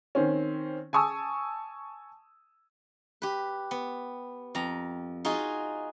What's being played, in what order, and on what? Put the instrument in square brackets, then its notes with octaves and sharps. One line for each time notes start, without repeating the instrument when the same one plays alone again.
[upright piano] D#3 C4 C#4
G#5 A5 C#6 D#6 E6
[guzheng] G4 B4
B3
F2 A#5
D#4 F4 F#4 G#4